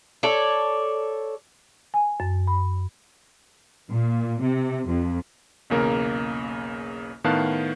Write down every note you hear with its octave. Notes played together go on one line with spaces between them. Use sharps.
A4 C#5 D5
G#5
F#2
B5
A#2
C3
F2
B1 E2 C#3 A#3 A#4
A2 D#3 B3 F5 A5 F#6